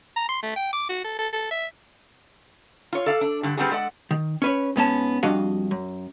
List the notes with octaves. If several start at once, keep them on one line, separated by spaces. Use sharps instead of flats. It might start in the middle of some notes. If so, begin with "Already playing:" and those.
A#5
C6
A3
G5
D6
F#4
A4
A4
A4
E5
F4 C#5
A4 D5 F5
D4
G2 D3
G3 B3 C4 D4 F#4 G#4
G#3 A4 D5 F#5
D#3
C#4 B4 C#5
G#2 B3 C#4 A5
F2 G3 D4 F#4 D#5 F5
F#2